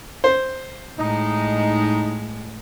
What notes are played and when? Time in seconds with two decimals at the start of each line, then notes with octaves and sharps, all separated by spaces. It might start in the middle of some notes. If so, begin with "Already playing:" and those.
0.24 C5
0.99 A2 G#3 D#4